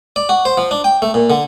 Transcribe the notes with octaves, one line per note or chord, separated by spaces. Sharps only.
D5
F#4
C5
F3
D4
G5
A3
A#2
D3